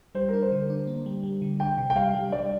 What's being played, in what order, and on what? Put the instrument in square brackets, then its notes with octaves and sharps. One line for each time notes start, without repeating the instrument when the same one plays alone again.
[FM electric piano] G3 [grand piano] C5
[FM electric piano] D4 [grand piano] A#4
[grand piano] C5
[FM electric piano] D3
D4
A#3
G3
G3
D3
[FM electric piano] D4 [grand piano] G5
[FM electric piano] C3
[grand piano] G5
[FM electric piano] G3 [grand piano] F5
[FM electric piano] G3
[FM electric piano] G3 [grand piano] D5